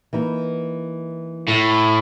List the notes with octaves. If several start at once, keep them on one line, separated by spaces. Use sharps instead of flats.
E3 A#3 D#4
A2